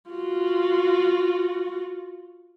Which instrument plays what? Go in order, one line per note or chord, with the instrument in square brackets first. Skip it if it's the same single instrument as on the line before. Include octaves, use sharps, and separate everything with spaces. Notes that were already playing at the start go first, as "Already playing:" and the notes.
[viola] F4 F#4